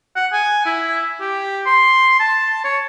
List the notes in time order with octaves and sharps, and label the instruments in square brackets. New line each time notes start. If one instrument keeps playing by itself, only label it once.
[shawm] F#5
G#5
E4
G4
C6
A5
C#5